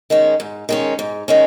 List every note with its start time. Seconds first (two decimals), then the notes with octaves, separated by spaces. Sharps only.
0.10 D#3 G#3 C#4
0.40 G#2
0.69 D#3 G#3 C#4
0.99 G#2
1.28 D#3 G#3 C#4